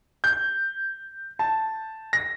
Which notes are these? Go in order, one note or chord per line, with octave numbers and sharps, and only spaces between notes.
G6
A5
A#6